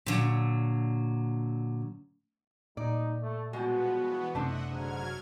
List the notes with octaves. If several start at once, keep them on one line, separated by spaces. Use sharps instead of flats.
A#2 D3 F#3
A#2 G3 A3 D#4 D5
A3
B2 F3 G3 G#3 B3 F#4
E3 B3
F#1 C3 A3 C4 D4 D#5 E5 F#5
G#2 D3 F#3 F6 G#6